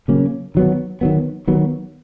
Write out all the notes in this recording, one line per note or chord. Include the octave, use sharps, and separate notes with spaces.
C#3 F#3 A#3 C#4
D#3 F#3 B3
D#3 F#3 B3
D#3 F#3 B3